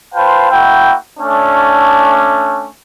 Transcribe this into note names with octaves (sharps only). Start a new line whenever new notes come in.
F4 B4 C5 F5 G5 A5
A#3 E4 F#4 G5
A3 C#4 D4